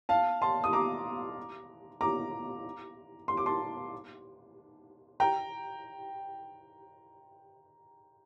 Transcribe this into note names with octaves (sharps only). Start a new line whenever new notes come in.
F5 A5
A5 C6
D#6
A#5 D6
A#5 D6
C6
D6
A5 C6
G5 A#5